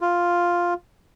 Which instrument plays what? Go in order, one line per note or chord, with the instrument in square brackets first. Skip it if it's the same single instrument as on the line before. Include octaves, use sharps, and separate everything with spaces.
[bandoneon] F4